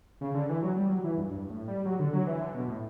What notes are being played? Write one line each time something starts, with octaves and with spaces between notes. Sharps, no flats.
C#3
D3
E3
F#3
G3
F#3
E3
G2
G2
A2
G3
F#3
D3
F#3
E3
D3
B2
A2